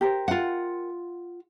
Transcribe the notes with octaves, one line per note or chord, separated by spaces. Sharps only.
G4 A#4 C5
F4 F#5